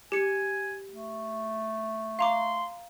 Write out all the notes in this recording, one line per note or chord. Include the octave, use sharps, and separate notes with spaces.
G4 G#5 C#7
A3
F5 A#5 C6 D6